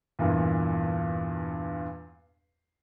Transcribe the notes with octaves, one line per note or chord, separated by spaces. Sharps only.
E2 G2 A#2 E3